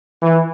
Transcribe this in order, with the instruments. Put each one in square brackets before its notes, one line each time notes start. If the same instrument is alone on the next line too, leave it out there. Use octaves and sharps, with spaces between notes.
[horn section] E3